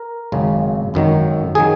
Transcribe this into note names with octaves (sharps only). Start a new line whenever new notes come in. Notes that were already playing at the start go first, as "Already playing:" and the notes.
Already playing: A#4
G#1 F#2 C#3
G#1 F#2 D#3 F#3
D#3 F#3 G#4